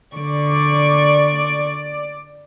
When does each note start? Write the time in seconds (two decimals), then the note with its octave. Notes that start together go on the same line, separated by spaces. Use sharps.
0.16 D3 D5 C#6